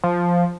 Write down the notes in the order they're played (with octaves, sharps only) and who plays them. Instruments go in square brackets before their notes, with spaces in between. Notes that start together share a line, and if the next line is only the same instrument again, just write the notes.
[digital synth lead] F3